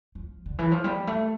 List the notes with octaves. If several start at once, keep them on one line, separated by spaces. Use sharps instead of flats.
F3
D3
E3
F3
G3
A3